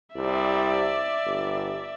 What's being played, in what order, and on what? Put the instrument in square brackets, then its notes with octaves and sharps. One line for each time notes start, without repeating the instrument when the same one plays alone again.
[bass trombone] C2 [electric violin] D5 E5
[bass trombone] G1